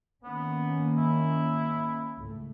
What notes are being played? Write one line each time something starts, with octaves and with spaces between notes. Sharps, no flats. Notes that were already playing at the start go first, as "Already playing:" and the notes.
D#3 A#3 B3 C#4
E4
C#2 A2 A3